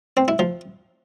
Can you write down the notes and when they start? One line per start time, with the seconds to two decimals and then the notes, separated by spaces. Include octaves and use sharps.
0.17 C4
0.28 E4
0.39 F3